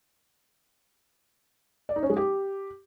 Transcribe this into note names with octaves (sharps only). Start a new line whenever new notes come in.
D5
D#4
C#4
G#3
G4